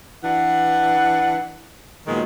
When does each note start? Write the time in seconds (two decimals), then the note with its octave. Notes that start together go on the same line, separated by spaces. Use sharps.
0.24 E3 D4 B4 F#5
2.07 A#2 D#3 F3 F#3 G#3 B3